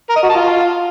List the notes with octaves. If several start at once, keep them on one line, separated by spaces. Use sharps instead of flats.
A#4
D#5
F#4
A5
F4